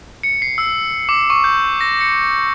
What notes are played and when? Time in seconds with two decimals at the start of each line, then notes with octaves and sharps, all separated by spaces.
0.23 C#7
0.42 C7
0.58 E6
1.09 D6
1.30 C#6
1.44 G6
1.81 A#6
2.01 C#7